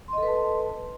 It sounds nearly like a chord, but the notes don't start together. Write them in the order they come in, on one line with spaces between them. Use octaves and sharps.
C6 D#5 A4 B4 A5